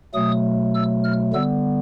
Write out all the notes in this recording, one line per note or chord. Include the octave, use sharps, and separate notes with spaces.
B2 F#3 A3 D#6
E6
F6
D3 G3 B3 E6